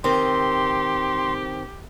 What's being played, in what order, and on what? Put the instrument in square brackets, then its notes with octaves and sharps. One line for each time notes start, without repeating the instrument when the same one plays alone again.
[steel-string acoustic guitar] D#3 C4 [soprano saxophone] G4 [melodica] C6